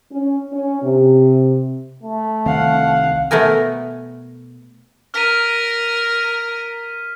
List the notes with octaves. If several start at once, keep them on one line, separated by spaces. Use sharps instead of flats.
C#4
C#4
C3
A3
C2 D#3 C4 F5 F#5
B2 A3 B3 A#4 G#5
A#4 F6 B6 D#7